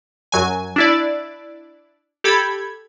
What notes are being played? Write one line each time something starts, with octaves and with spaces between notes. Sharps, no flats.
F#2 F#3 G#5
D4 E4 D5
G4 A4 B5 G#6